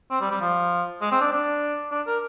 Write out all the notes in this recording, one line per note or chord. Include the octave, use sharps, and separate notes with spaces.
C4
G3
G3
F3
G#3
C4
D4
D4
D4
A#4